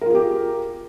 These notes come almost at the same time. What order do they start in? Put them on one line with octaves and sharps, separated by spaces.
A#4 F4 G#4 G4